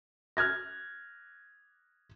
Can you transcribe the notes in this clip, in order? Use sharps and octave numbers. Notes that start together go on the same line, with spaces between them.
F6 F#6 G#6 A#6